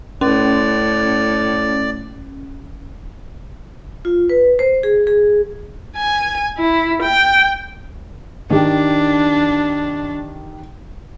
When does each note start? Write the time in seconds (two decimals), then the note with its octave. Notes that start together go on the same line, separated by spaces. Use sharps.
0.21 A2 C#4 D5
4.05 F4
4.29 B4
4.59 C5
4.83 G#4
5.07 G#4
5.97 G#5
6.59 E4
7.03 G5
8.50 D#3 D4 G4